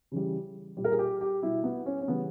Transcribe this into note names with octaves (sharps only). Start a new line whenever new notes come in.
C#3 E3 G3
A#2 G3
A#4
G#4
G4
G4
B2 G3 E4
B3
C#4
C#4
C#3 E3 G3 B3